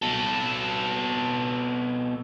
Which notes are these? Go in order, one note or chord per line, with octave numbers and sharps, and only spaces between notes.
B2 A4